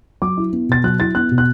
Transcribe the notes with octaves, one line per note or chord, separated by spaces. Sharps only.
F#3 D6
E4
B3
B2 A6
F#3 F#6
E4 A6
B3 F#6
B2
F#6